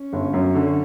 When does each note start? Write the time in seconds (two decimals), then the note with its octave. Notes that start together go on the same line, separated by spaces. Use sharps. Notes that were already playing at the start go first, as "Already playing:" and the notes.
Already playing: C#4
0.13 G1
0.34 F#2
0.55 D3